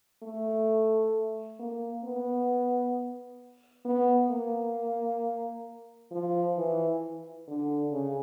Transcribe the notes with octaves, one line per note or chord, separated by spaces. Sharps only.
A3
A#3
B3
B3
A#3
F3
E3
D3
C#3